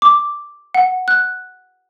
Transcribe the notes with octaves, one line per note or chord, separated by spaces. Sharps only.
D6
F#5
F#6